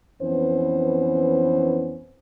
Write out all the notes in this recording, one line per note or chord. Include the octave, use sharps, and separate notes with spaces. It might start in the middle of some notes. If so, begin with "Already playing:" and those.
F2 E3 B3 C#4 C5